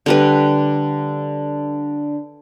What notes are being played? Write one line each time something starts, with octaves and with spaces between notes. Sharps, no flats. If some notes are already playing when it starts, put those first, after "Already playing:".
D3 G3 B4